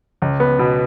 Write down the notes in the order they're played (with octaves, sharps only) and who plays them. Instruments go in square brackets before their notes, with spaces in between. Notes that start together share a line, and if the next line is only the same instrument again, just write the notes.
[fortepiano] C#2
B3
B2